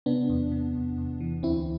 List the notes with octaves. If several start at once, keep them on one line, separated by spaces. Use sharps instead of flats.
C3 B3 D4
E2
C3
E2
E2
E3
D2 C4 E4